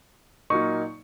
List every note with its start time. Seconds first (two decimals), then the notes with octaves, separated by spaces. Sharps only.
0.50 A#2 F#3 A#3 D#4 C#6